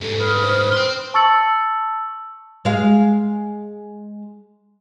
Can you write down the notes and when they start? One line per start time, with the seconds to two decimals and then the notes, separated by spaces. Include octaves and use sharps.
0.01 G#2 G3 A4
0.18 B4 D#6 F6
0.41 C5
0.72 G5 C6
1.14 A5 C#6 E6 A6 C#7 F#7
2.65 G#3 F5